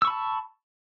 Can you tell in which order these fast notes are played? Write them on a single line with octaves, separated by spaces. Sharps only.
E6 C#6 B5 A5